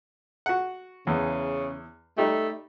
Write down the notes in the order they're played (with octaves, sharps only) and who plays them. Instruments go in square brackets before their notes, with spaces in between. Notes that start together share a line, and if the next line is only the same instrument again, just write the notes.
[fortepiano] F#4 F#5
[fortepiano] E2 [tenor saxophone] C#3
[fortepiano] G3 D#4 G4 [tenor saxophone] A3